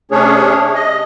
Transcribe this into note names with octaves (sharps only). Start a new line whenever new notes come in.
C3 A3 C#4 D4 G#4 C#5
D#5